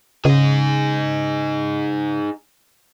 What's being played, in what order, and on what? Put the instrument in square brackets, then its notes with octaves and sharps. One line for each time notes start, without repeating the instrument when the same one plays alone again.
[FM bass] C#3 [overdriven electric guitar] D#4 G#4